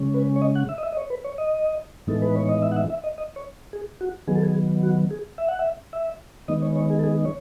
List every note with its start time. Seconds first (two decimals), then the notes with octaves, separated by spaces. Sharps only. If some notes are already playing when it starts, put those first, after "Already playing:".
Already playing: C#3 G#3 C#4
0.14 B4
0.36 C#5
0.42 D#5
0.55 F#5
0.69 E5
0.78 D#5
0.83 E5
0.92 D#5
0.97 C#5
1.10 B4
1.24 C#5
1.38 D#5
2.07 A2 E3 G#3 B3 D#4 A4
2.22 B4
2.36 C#5
2.49 D#5
2.62 E5
2.72 F#5
2.76 E5
2.90 E5
3.04 D#5
3.18 D#5
3.36 C#5
3.73 G#4
4.01 F#4
4.27 D#3 F#3 B3 G#4
4.35 A4
4.43 G#4
4.83 F#4
5.10 G#4
5.38 E5
5.48 F#5
5.59 E5
5.93 E5
6.48 D#3 G#3 B3 D#4 D#5
6.62 C#5
6.76 C#5
6.90 G#4
6.99 A4
7.04 G#4
7.25 C#5